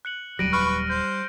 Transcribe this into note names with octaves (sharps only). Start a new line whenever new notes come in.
F#6 C#7 F#7
D#1 A#1 F#3 G3 A#6 D7 D#7
B4 B5 C#6 F6
C5 G6